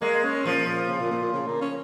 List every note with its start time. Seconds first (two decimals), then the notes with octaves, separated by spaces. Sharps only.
0.01 G#3 A#3
0.24 C#4
0.45 A#2 F3
0.67 A#2
0.89 C#3
1.00 A#2
1.11 A#2
1.22 A#2
1.33 C#3
1.47 A#3
1.61 C#4